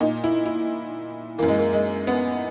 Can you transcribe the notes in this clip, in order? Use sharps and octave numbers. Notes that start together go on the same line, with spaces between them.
A#2 D#4
E4
E4
F#2 E3 A#3
G#3
A#3
G#3
B3